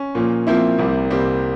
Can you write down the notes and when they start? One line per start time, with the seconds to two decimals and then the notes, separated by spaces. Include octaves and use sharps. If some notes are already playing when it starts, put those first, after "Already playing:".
Already playing: C#4
0.15 A#2 F3 A#3
0.47 A#2 F3 A#3 C4 E4
0.79 C2 C3 G3 A#3
1.10 C2 C3 G3 A#3 C4